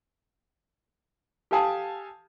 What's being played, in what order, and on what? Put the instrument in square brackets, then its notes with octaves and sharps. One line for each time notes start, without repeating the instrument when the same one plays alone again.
[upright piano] G4 A4 F5 G#5 A5 D#6